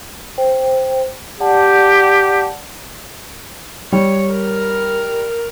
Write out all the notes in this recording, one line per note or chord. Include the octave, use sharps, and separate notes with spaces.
C5 G5
G4 D5 F#5 A5
G3 C#5
A#4